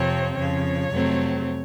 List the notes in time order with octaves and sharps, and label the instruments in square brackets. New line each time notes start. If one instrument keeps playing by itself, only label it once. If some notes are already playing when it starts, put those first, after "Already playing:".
Already playing: [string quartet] F2 C3 F3 C4 C#5
F2 C#3 F3 C#5
F2 C3 F#3 A3 C4